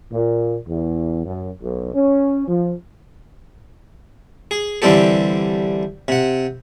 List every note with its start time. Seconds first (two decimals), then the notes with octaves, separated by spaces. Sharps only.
0.12 A#2
0.67 E2
1.25 F#2
1.61 B1
1.94 C#4
2.48 F3
4.51 G#4
4.82 D3 E3 G3 C4 G4 A4
6.08 C3 F#5